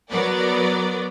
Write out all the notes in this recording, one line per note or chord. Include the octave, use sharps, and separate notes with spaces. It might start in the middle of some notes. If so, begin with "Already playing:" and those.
F#3 B3 A#4 B4 D5